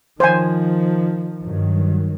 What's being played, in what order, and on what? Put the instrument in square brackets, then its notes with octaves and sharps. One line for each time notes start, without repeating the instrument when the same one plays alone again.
[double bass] D#3 F3 [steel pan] C5 G#5
[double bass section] G2 D#3 F#3